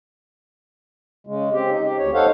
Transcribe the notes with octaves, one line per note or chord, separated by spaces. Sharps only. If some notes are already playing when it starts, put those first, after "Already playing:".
C#3 G#3
C4 G4
D#4
G4
D2 C#5
D#4 A4 C5 C#5 F5 F#5